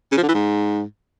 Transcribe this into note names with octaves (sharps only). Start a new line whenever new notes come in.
C#3
F3
D3
E3
G#2